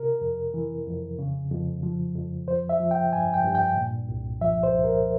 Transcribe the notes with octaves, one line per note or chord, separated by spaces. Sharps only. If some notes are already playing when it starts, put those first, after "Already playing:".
Already playing: C3 A#4
F2
E3
F2
C#3
F2
F3
F2
F3 C5
E5
F3
G5
G2 G#5
G5
G2
G5
A#2
C2
F3 E5
C5
C2
A#4